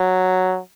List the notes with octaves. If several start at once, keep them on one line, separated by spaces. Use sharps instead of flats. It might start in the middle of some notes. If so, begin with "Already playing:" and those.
Already playing: F#3